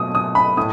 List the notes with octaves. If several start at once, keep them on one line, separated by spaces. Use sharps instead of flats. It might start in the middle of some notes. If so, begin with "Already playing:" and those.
Already playing: B2 F#3 A3 D#6
D#6
B5
A2 D#6